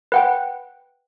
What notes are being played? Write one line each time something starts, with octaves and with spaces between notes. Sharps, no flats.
B4 F#5 G5